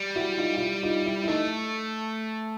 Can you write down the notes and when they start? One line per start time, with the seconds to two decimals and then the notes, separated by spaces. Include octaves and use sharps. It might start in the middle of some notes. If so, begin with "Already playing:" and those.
Already playing: G3
0.16 E4 F#4
0.38 D#4 F4
0.56 F4
0.60 E4
0.83 D#4 F4
1.06 E4
1.23 E4
1.27 A3 D#4